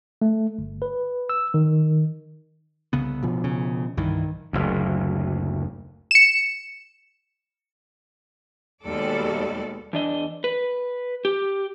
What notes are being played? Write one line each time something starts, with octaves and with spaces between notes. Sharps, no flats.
A3
G1
B4
E6
D#3
C2 C#3 B3
B2 F3
C#3
C2 G2 D#3 E3
F#1 D2
C#7 E7
D#2 B2 G3 G#3 A4 D5
E2 D4 D#5
B4
G4